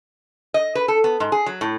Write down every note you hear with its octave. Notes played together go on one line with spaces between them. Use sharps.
D#5
B4
A4
B3
G#2
G#4
F#3
A2